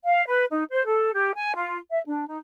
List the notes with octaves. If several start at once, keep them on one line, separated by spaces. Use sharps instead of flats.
F5
B4
D#4
C5
A4
G4
G#5
F4
E5
D4
D#4